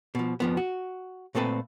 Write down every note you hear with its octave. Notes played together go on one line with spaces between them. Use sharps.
B2 F3
F2 F3 B3
F#4
A#2 A3 C4 A4 B4